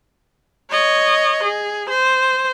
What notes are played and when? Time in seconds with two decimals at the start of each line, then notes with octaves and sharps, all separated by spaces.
0.71 C#5 D#5
1.44 G#4
1.90 C5